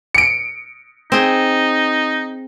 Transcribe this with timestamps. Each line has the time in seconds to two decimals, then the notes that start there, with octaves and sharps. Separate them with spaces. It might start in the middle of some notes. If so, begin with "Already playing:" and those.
0.15 C#7 D7
1.12 C4 D#4 G#4